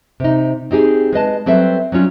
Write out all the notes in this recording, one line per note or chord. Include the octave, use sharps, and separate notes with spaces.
C3 D#4
C4 D#4 G4 G#4
G#3 B4 D#5 A5
F#3 G3 C4 A4 B4 E5
F#3 G3 C#4 F4